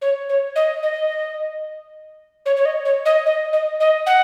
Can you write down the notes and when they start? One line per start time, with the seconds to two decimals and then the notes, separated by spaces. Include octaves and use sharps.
0.02 C#5
0.29 C#5
0.56 D#5
0.83 D#5
2.46 C#5
2.57 C#5
2.65 D#5
2.85 C#5
3.05 D#5
3.26 D#5
3.53 D#5
3.80 D#5
4.06 F#5